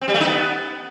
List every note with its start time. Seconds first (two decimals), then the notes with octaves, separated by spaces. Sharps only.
0.01 C4
0.08 G3
0.14 A3
0.20 D#4
0.27 B3